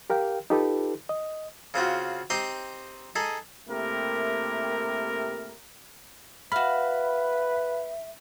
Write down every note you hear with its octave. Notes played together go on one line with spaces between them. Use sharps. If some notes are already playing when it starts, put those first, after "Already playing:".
G4 A#4 F5 G5
D#4 F4 G4 A4 B4
D#5
C#3 C4 F4 F#4
C4 D#4 G4 G5 C6 D#6
D#4 G#4 A4
C3 A3 A#3 E4 G4 A#4
F#4 B4 E5 F5 B5